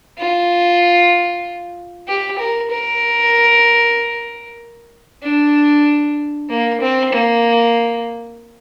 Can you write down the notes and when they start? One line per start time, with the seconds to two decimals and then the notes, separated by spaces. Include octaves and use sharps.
0.19 F4
2.07 G4
2.39 A#4
2.70 A#4
5.23 D4
6.49 A#3
6.81 C4
7.12 A#3